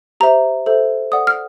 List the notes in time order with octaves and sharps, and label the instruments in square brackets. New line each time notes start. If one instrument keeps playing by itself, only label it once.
[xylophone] G4 C5 E5 A#5
A4 C5 E5
A4 D5 F#5 D#6
F6